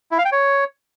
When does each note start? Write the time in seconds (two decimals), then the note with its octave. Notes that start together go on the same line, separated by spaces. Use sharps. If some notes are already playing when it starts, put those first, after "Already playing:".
0.11 E4
0.18 F5
0.25 G5
0.32 C#5